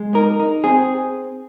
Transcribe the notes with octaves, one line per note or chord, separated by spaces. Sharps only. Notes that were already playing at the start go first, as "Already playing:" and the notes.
Already playing: G#3
D#4 A#4
D#4
C4 G#4